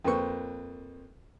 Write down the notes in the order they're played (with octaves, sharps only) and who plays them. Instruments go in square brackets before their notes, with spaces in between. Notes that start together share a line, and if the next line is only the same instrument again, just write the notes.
[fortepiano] F2 A#3 B4 C5 C#6